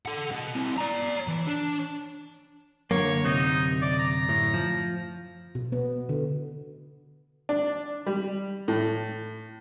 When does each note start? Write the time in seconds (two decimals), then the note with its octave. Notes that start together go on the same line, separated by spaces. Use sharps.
0.05 A4 F#5
0.31 B2
0.55 C4 E4
0.78 D5 A#5
1.28 E3
1.47 D4
2.91 F#2 D3 A#3 C#5
3.25 C3 D#4
3.82 D5
3.99 A#5
4.29 A2
4.54 F3
5.55 B2
5.72 B3
6.09 D3
7.49 D4
8.06 G3
8.68 A2